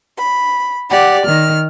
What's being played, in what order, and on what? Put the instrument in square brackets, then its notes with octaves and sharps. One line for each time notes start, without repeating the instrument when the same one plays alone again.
[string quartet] B5
G4 D5 F#5
D#3 F6